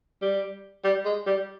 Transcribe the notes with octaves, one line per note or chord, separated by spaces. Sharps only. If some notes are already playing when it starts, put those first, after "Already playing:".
G3
G3
G#3
G3